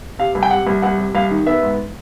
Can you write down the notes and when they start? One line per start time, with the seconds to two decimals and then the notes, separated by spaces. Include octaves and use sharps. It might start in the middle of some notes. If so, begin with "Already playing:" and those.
0.19 C3 F5
0.35 C2
0.43 G5
0.51 C3 F#5
0.67 C2
0.82 C2 F#5
0.98 C3
1.15 C2 F5
1.31 D#3
1.47 B3 E5
1.63 G#2